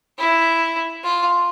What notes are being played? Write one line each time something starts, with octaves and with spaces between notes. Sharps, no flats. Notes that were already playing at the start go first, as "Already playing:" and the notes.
E4
F4